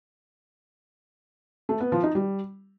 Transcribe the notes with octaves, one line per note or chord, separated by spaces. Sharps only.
A3
B3
F3
D#4
G3